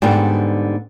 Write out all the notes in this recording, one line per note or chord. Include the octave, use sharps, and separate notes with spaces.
G#2 D3 G3 B3